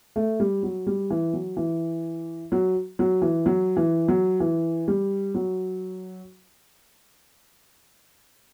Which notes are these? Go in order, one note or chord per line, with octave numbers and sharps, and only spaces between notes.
A3
G3
F#3
G3
E3
F#3
E3
F#3
F#3
E3
F#3
E3
F#3
E3
G3
F#3